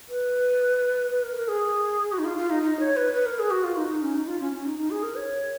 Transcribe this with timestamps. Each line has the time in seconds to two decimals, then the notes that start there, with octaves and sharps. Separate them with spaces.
0.09 B4
1.11 B4
1.23 A#4
1.36 A#4
1.48 G#4
2.12 F#4
2.19 D#4
2.25 F4
2.37 F4
2.50 D#4
2.63 D#4
2.80 C#5
2.97 B4
3.13 B4
3.26 A#4
3.39 G#4
3.51 F#4
3.64 F4
3.77 D#4
3.89 D#4
4.02 C#4
4.15 D#4
4.27 F4
4.40 C#4
4.52 C#4
4.65 D#4
4.78 D#4
4.90 G#4
5.03 A#4
5.15 C#5